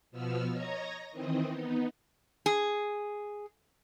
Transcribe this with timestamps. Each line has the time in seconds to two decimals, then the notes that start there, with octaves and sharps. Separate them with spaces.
0.11 B2 F3 B3 E6 F6
0.52 C#5 D#5 A#5 G#6 A#6
1.11 D#3 E3 C4 D#5
1.50 B3 D#4
2.46 G#4